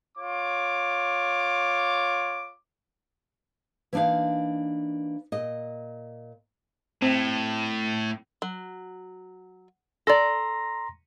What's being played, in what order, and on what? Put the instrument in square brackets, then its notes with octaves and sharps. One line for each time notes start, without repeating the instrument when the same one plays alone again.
[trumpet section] F4 C#5 D6
[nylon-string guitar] E3 A#3 D4 D#4 F5
A#2 D#5
[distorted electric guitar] A2 [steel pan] C4
[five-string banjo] F#3
[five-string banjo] A4 D5 [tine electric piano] A#5 C6 A#6